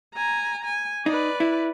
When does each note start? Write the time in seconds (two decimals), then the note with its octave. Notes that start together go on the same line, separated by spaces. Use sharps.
0.15 G#5 A#5
0.65 G#5
1.06 D#4 B4 D5
1.40 E4